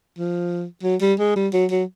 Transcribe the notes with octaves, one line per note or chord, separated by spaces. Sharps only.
F3
F#3
G3
G#3
G3
F#3
F#3